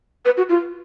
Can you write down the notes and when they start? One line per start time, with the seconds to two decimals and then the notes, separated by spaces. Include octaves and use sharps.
0.25 B4
0.37 F#4
0.49 F4